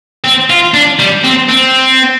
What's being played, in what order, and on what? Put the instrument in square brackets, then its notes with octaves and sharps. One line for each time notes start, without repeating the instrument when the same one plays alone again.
[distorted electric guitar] C4
F4
D4
G3
C4
C4